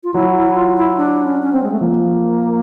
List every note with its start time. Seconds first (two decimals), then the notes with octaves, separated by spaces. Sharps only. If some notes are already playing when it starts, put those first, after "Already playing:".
0.04 F4
0.14 F#3 E4
0.35 E4
0.55 F4
0.77 E4
0.97 D4
1.24 C#4
1.42 C#4
1.52 C4
1.63 G#3
1.72 A3
1.80 F3 A#3